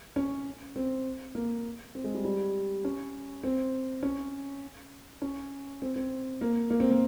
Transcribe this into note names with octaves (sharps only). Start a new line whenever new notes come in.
C#4
C4
A#3
C4
G#3
G3
G3
C#4
C4
C#4
C#4
C4
C4
A#3
A#3
C4
A#3